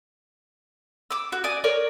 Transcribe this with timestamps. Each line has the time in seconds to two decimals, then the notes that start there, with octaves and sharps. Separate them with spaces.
1.11 D6 E6
1.32 F#4
1.44 D5 G#5 D#6
1.64 A#4 C#5 D5